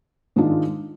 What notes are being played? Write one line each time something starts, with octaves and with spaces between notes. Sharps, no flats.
G#2 D#3 G#3 D4 F4